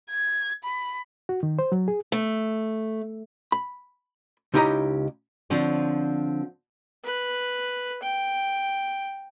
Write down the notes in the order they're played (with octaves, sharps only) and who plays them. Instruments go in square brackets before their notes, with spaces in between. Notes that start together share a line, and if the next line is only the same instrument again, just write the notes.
[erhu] G#6
B5
[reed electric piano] F#4
D#3
C5
F#3
G#4
[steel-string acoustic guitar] A3
[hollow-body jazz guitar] B5
C#2 D#4 E4 G4 D#5 A#5
[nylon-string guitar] D3 F3 C4 D4 C#5
[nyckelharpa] B4
G5